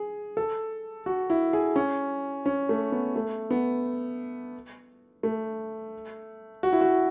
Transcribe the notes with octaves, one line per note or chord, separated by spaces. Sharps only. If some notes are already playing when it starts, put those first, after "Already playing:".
Already playing: G#4
A4
F#4
E4
G#4
C#4
C#4
A3
B3
A3
B3
A3
F#4
E4
F#4